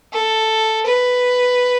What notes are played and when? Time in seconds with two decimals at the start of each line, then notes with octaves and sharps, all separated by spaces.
0.13 A4
0.86 B4